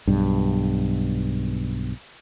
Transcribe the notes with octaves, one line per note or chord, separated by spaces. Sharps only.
B1 G2